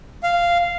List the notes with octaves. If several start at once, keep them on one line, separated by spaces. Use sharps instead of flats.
F5